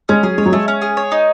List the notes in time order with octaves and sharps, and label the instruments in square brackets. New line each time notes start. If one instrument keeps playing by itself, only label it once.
[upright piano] G#3 [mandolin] C#4
[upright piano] F#3 [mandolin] G#4
[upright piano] G#3 [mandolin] C#5
[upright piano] F#3
[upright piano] G#3 [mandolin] A3
[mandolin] C#4
G#4
C#5
D#4